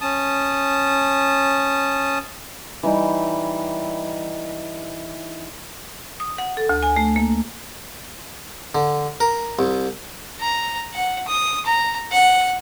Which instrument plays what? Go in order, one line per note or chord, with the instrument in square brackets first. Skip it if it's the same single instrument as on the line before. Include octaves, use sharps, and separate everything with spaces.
[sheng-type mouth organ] C#4 A5 D#6
[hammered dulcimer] E3 G3 D#4
[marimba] D#6
F#5
A4
D2
G#5
A3
A#3
[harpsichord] D3
A#4
C2
[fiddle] A#5
F#5
D#6
A#5
F#5